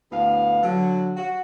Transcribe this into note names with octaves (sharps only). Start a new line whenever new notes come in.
D2 A2 B3 F5
D3 F#3
F#4